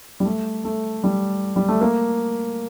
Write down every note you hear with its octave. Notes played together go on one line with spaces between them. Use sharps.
G3
A3
A3
G3
G3
A3
A#3